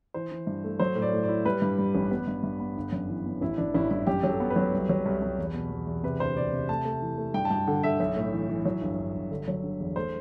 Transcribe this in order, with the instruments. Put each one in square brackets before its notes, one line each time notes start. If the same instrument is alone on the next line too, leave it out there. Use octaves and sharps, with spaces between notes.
[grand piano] E3 [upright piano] C5
[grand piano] E3
G2
A3
[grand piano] F#3 [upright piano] C5
[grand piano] A2
[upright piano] D5
[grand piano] A2
[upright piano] D5
[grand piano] E4
[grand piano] G3 [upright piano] B4
[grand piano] G2
G3
A1
[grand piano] B3 [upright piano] B4
[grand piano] G2
G2
B3
G1
F#2
E3
B3
[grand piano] A1 [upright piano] E4
[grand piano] A1 [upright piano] D4
[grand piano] A1 [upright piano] E4
[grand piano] G2 [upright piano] E4
[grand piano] F#2 [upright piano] G4
[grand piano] F#3
[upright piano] A4
[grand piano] B3
[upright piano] B4
[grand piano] F#3
C2
F#3
C2
C2
E2
B2
E2
E2
[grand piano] C3 [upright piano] B4
[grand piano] D2 [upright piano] C5
[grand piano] C3 [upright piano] D5
[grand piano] C3
[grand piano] A3 [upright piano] A5
[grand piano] A3
E3
A3
[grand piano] G2 [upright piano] G5
[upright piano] A5
[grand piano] G2 [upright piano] G5
[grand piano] D3 [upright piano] F#5
[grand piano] D3 [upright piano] E5
[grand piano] B1 [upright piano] E5
[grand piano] A2
E3
E3
F#3
G1
G1
G1
D3
F#3
D3
E2
[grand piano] A3 [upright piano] C5